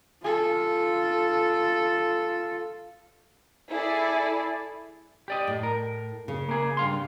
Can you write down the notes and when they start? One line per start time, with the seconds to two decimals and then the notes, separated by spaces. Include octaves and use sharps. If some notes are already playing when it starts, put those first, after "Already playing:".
0.22 F4 A4
3.71 E4 G#4 A4 D5
5.28 G4 D5 D#5
5.47 A2
5.63 A#4
6.28 C#3
6.49 A#3 G#4
6.77 G2 F5 C6